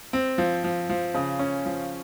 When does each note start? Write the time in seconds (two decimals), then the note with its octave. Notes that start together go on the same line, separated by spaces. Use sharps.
0.13 C4
0.38 F3
0.64 F3
0.89 F3
1.14 C#3
1.39 C#4
1.66 F3